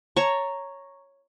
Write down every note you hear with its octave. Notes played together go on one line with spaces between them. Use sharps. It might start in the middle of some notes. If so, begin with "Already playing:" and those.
C#5 A5 A#5 C#6